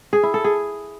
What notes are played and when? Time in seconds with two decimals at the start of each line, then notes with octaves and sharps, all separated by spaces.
0.13 G#4
0.23 E4
0.34 A4
0.44 G#4